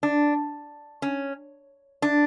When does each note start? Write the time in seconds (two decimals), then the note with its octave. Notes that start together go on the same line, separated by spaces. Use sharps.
0.03 D4
1.02 C#4
2.02 D4